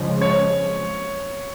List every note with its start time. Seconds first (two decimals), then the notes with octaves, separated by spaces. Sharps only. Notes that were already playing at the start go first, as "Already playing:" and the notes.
Already playing: C#3 F3 G#3
0.21 C#5